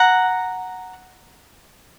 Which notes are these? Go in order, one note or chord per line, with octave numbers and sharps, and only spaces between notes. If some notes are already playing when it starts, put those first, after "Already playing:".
Already playing: F#5 A#5